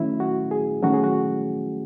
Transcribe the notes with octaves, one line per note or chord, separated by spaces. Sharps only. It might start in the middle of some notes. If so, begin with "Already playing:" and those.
Already playing: D#3 F#3 A3 C#4 E4
F#4
G#4
D#3 F#3 A3 C#4 F#4
G#4
F#4